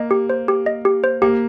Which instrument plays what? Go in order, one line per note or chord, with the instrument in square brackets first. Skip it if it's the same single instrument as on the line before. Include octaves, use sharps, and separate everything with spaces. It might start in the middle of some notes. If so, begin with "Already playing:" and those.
Already playing: [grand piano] A#3 [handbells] D#5
[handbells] G4
C5
G4
D#5
G4
C5
[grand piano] A#3 [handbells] G4